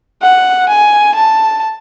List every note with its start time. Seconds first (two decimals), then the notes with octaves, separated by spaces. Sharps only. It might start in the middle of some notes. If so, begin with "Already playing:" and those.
0.23 F#5
0.69 G#5
1.15 A5